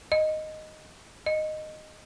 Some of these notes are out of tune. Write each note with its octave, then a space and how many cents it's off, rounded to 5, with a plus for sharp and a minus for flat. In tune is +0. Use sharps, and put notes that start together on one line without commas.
D#5 -5
D#5 -10